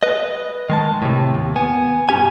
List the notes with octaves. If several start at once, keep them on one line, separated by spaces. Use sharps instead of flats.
B4 D#5
D#3 G#3 A5
A2 C3
D#2
B3 G#5
G2 B2 C#4 G4 G#5